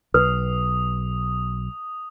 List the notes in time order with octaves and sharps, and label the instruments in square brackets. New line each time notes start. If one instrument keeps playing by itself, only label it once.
[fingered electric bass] B1 [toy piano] B4 [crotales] D#6